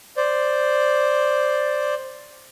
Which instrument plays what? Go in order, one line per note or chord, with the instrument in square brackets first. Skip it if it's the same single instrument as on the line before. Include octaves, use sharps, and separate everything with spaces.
[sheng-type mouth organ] C5 D5